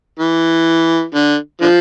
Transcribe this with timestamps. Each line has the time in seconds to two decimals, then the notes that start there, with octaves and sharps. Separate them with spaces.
0.20 E3
1.15 D3
1.62 D3 F3